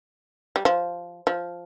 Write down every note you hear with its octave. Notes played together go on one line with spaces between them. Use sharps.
G3
F3
F3